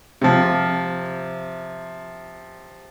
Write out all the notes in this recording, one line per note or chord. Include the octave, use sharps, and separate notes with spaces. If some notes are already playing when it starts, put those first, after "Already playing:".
C3 F3